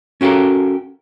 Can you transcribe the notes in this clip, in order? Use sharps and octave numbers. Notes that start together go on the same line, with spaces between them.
C#4 F#4 G4 A4 A#4